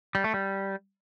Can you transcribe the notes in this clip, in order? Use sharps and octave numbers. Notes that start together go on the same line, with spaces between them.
G3
A3
G3